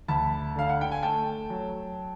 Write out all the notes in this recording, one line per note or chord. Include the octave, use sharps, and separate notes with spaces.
D2 A5 B5
D3 F5
F#5
G5
G#5
A3 G5 A5
F#3